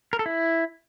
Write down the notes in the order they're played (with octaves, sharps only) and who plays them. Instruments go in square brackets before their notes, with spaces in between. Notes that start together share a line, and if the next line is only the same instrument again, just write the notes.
[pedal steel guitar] A#4
A4
E4